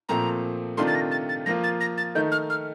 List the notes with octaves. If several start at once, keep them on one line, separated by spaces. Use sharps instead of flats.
A#2 F3 A3 C4 A#5
C3 D#3 A3 D4 F4 C6
A6
A#6
A6
A6
F3 A#3 F4 A#6
A6
A#6
A6
D#3 A3 D#4 G6
F6
F6